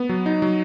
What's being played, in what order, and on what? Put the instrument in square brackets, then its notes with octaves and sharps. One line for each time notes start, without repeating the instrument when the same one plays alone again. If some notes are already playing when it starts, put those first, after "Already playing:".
Already playing: [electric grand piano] B3
F#3
D#4
F#3